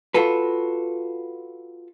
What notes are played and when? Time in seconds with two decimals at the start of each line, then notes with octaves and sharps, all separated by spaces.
0.14 F4 F#4 A4 B4